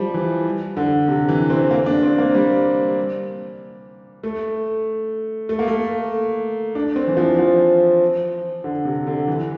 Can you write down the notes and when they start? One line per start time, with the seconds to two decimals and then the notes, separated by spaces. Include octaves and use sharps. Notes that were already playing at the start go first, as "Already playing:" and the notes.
Already playing: F3 G3
0.14 E3
0.77 D3
1.08 C3
1.29 E3
1.50 C4
1.71 A#3
1.86 D4
2.03 C4
2.18 A#3
2.35 G3
4.23 A3
5.49 A3
5.59 A#3
5.68 A3
6.75 D4
6.96 C4
7.08 E3
7.17 F3
7.39 F3
8.64 D3
8.85 C3
9.07 D3
9.28 E3